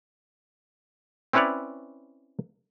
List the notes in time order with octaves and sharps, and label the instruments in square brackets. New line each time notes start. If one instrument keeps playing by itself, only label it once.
[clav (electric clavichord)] C4 C#4 E4 B4 C#5 D5